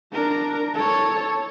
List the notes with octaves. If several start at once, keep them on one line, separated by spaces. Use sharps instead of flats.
D4 A#4
A4 C#5